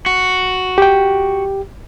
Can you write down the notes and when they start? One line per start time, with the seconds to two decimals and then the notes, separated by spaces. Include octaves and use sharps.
0.06 F#4
0.78 G4 G5